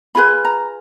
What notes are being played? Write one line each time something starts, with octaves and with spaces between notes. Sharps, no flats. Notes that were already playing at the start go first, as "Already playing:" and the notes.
F4 G#4 B4 B5
A#5